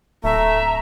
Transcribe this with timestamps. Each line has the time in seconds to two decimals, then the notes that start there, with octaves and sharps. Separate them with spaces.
0.24 D1 A3 E5 A#5